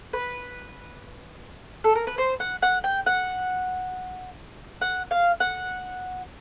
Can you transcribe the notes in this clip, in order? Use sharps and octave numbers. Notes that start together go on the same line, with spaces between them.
B4
A4
A#4
B4
C5
F#5
F#5
G5
F#5
F#5
F5
F#5